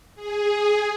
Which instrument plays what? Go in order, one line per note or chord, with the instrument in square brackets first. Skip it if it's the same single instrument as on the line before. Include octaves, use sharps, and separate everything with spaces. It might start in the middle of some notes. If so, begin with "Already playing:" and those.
[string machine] G#4